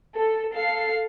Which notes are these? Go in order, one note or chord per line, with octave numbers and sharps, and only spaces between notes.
A4
A4 F5 C7